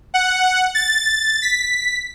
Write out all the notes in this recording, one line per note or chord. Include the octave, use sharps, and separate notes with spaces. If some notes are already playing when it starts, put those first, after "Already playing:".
F#5
A6
B6